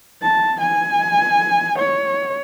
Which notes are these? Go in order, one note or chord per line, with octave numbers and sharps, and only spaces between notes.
A5
G#5
C#5